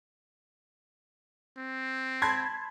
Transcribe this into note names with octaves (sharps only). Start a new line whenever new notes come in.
C4
A5 B5 C6 G#6